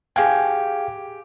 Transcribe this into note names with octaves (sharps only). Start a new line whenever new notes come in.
G4 G#4 F5 G5 G#5